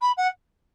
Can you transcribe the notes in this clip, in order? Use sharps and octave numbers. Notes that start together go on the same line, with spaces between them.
B5
F#5